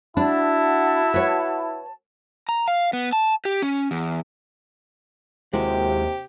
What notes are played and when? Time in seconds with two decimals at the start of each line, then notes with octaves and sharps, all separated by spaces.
0.17 D4 E4 F#4 F#5 A5
1.14 B4 C#5
2.49 A#5
2.68 F5
2.93 B3
3.13 A5
3.45 G4
3.62 C#4
3.91 E2
5.54 D#2 C3 G#3 E4 F#4 G4